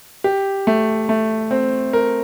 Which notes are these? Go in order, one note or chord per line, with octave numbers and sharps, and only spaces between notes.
G4
A3
A3
C4
A#4